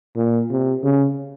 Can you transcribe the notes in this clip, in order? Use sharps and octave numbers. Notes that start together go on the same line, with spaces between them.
A#2
C3
C#3